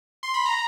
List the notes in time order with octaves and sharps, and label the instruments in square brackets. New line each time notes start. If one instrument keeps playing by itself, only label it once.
[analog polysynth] C6
B5
A#5